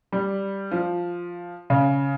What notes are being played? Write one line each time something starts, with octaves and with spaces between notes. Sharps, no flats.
G3
F3
C#3